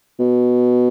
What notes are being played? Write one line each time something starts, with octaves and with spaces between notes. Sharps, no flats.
B2